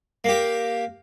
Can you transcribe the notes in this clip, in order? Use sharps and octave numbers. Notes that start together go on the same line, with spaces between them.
A#3 G4